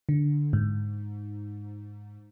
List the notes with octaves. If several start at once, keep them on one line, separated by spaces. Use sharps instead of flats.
D3
G#2